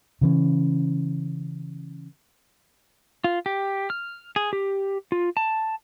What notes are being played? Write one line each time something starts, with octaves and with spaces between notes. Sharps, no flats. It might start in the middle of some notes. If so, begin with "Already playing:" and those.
C#3 E3 C#4
F4
G4
F6
G#4
G4
F4
A5